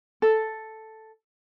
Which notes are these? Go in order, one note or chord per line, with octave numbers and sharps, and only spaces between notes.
A4